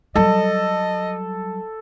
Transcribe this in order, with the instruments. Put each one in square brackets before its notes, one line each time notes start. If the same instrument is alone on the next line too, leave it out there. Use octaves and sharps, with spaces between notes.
[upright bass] F#3 G3 [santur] A4 [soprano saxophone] D#5